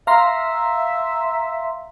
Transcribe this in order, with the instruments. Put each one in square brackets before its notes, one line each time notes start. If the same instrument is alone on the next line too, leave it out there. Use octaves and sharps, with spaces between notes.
[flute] E5 [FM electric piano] F5 A#5 C6